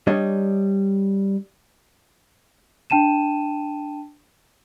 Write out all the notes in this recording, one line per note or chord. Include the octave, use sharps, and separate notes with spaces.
G3 D4 C#5 D#5
D4 G5 A5 D#7 E7